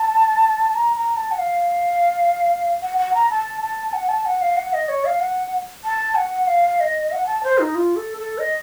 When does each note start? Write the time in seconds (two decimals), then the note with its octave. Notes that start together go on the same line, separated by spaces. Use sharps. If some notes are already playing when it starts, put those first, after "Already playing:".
Already playing: A5
0.75 A#5
0.96 A#5
1.17 A5
1.31 F#5
1.39 F5
2.82 F#5
2.98 F#5
3.14 A#5
3.30 A5
3.62 A5
3.93 F#5
4.09 A5
4.26 F#5
4.42 F5
4.57 F#5
4.73 D#5
4.89 C#5
5.05 F5
5.20 F#5
5.84 A5
6.16 F#5
6.47 F5
6.80 D#5
7.12 F#5
7.27 A5
7.43 C5
7.59 D#4
7.75 F4
7.96 A4
8.18 A4
8.38 D#5